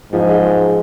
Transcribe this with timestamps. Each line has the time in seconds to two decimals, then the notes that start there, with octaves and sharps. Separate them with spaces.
0.13 G#2 F3
0.29 G#3